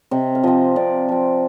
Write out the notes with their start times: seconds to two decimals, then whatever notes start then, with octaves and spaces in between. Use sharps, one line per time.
0.11 C3 D#5
0.35 F5
0.43 F3 C4 D#5
0.76 C3 D5
1.09 F3 C4